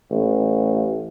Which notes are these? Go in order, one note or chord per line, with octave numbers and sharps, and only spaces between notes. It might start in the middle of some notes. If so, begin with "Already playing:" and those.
A1